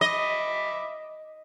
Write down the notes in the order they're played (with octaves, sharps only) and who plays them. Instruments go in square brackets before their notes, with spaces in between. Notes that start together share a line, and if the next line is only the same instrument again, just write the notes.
[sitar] D#5 [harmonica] E5 B5 D6